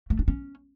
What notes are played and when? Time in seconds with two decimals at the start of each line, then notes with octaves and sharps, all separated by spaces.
0.10 A3
0.19 D4
0.28 C#4